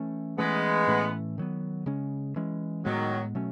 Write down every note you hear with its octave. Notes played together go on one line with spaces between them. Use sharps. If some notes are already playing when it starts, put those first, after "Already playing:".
Already playing: E3 A3 C#4
E3 G#3 A3 B3 C#4
A2 E3 A3 C#4
D#3 F#3 B3
C#3 G#3 C#4
E3 G#3 C#4
A2 D#3 F#3 G#3 B3
B2 F#3 A3 C#4